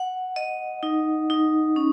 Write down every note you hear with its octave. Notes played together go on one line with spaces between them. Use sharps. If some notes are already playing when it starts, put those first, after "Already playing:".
Already playing: F#5
D#5
D#4
D#4
C#4